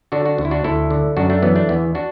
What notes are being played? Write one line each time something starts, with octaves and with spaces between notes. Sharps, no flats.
D3 D4 F#4
D4 F#4
D2
E4
D4 F#4
D2 E4 A4
D3
F#2 D4 F#4
A3 D4
E3 F#3 B3
A3 D4
E2 B3 E4
D4 F#4